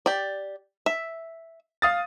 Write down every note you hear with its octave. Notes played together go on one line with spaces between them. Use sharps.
G4 D5
E5
F5 D#6 A6